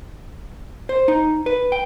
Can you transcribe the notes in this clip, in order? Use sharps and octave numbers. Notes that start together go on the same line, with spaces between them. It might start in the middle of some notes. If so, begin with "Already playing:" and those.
C5
D#4
B4
G5